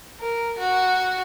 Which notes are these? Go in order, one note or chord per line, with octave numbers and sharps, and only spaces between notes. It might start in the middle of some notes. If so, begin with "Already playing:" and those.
A#4
F#4